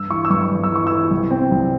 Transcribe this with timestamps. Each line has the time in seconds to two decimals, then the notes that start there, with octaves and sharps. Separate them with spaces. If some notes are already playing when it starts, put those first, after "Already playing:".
Already playing: G2 E6
0.10 E3 C#6
0.25 E6
0.30 G2 C#6
0.51 G2
0.64 E6
0.71 E3 C#6
0.87 E3 E6
1.11 C2
1.31 C4
1.51 C2